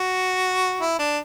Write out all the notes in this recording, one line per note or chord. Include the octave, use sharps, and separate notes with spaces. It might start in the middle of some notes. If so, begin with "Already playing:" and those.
Already playing: F#4
E4
D4